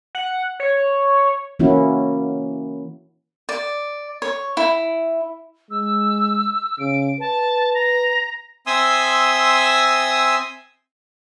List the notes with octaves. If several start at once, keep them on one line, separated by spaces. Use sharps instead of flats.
F#5
C#5
E3 A#3 C#4 E4 F#4
D5
C#5
E4
G#3 E6
C#3 D7
B4 A5
A#5
C4 E5 G#5 C6 D#6 E6